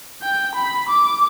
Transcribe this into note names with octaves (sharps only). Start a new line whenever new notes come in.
G5
B5
D6